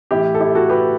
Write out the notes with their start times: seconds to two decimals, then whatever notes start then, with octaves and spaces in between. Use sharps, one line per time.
0.11 A2 E3 E4 G4
0.35 A4
0.40 E4 G4
0.55 F#4 A4
0.70 G4 B4